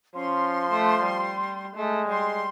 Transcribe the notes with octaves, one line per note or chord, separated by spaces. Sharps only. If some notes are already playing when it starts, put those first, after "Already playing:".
F3 C#4 C6
A3
G3
G#3 A3
G3 C6